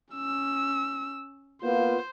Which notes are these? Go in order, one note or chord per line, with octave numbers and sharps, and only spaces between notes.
C#4 E6
A#3 B3 F4 C5